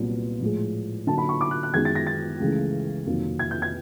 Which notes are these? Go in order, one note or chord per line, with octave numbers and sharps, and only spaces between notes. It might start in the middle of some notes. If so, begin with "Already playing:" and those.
Already playing: C2 A#2 F#3 B3
A2 F3 G#3
D3 F#3 A#3 D#4 A5
B5
C#6
D6
F#6
F#6
F#2 D#3 G#3 B3 G#6
A6
A#6
A6
C#2 C#3 E3 A3
F2 C3 D#3 F#3 A#3
G#6
G6
G#6